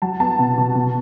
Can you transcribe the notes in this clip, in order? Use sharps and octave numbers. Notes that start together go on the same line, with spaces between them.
F#3 A5
B3 A5
B2
B2
B2